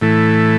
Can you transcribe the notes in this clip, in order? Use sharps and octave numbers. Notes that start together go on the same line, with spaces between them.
A2 E3 A3